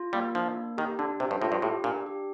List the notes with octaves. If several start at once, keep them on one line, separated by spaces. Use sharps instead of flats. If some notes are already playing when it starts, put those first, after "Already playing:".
Already playing: F4
G3 A#3
F3 D4
A#3
D#3 G4
D3 D4
C3 C5
G2
A2 F4
G2
A2 G4
A#2 D4
G4